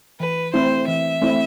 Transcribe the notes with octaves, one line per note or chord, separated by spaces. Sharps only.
E3 B4
A3 C4 E4 C5
E3 E5
A3 C4 E4